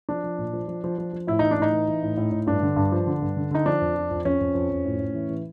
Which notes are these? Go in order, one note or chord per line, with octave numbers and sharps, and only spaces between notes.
F3 D4
F3
A#2
F3
F3
F3
F3
F3
A2 E4
E3 D#4
D4
A2 D#4
E3
E3
A2
A2
A2
G2 D4
D3
G2
F3
D3
G2
D3
D3 D#4
F3 D4
F2
F3
F2
F2 C#4
F2
F2
F2
A2
A2
E3
E3